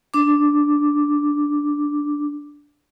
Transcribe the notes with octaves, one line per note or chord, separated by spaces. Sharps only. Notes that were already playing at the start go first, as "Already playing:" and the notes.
D4 D6